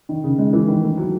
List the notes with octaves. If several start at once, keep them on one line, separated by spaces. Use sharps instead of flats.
D#3
C#3
G#3
E3
D#3
A3
F#3